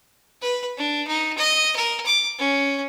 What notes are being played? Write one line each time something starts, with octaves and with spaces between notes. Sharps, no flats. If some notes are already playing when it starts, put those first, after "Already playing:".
B4
D4
D#4
D#5
A#4
D6
C#4